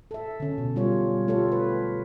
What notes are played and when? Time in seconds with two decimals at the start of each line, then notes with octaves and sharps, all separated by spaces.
0.11 A4 E5
0.40 D3 C#4
0.58 B2
0.76 G3 F4 C#5
1.28 A3 F4 G4 A4 C#5
1.52 B4